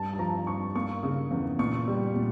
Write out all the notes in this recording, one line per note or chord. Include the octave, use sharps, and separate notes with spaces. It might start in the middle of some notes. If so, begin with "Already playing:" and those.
Already playing: G2 A5
A5
F3 A#5
G2 C#6
A#3 C#6
C#3
E2
A#2 C#6
G3
A#2